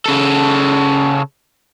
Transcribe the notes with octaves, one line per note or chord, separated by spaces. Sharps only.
C#3 A4